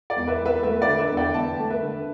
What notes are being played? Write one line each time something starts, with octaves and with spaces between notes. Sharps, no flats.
D5
E2
B4 E5
E2
B4 E5
A3 B4 E5
D5
D3
B4 E5
E2
D5 G5
E2 E5 A5
A3
B4 E5
D3